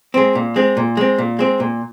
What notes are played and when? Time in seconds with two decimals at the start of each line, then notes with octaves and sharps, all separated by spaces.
0.14 G#3 C4
0.35 A#2
0.56 G#3 C4
0.77 A#2
0.97 G#3 C4
1.18 A#2
1.39 G#3 C4
1.60 A#2